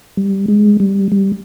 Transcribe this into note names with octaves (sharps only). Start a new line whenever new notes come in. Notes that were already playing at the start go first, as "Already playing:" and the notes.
G3
G#3
G3
G3